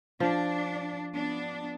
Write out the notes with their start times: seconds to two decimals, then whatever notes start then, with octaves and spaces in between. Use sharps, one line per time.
0.20 F3 D4
1.14 B3 D4